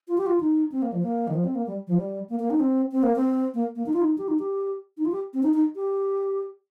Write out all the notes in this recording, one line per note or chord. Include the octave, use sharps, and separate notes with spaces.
F4
G4
F4
D#4
C4
A#3
F3
A#3
D#3
F3
C4
A#3
G3
F3
G3
A#3
A#3
D#4
C4
C4
A#3
C4
A#3
A#3
D#4
F4
D#4
G4
D#4
G4
D#4
F4
G4
C4
D#4
D#4
G4